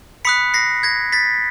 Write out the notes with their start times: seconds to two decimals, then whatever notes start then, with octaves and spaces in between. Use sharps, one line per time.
0.25 B5 D#6 F#6 B6 C#7
0.54 A#6 C7
0.83 G#6 A#6
1.12 A6 B6